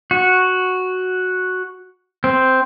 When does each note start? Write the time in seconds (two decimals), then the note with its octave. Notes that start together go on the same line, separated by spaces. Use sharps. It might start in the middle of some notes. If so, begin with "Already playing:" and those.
0.11 F#4
2.24 C4